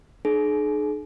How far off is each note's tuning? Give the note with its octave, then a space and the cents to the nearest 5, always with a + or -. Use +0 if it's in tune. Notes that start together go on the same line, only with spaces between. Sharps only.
D4 +45 G#4 +40